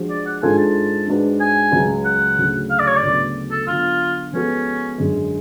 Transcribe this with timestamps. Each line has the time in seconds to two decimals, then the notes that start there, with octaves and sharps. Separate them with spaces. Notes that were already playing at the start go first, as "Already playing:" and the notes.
Already playing: F3 G#3 D4 F#4
0.10 D5
0.26 F#5
0.43 G#2 G#3 D4 F4 A4 G#5
0.58 A5
1.07 G#2 G#3 D4 F#4 B4
1.41 G#5
1.72 C#2 C#3 F#3
2.05 F#5
2.38 D2 C#3 F#3
2.70 F5
2.79 D5
2.87 C#5
2.96 D5
3.03 D2 C#3 F#3 B3
3.51 A4
3.67 D3 F#3 B3 F4
4.33 F3 G#3 B3 C#4 F#4 A4
4.98 F#2 D3 G#3